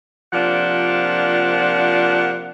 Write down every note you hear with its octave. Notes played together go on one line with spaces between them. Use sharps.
C3 F3 A#3 D4 F4 F#5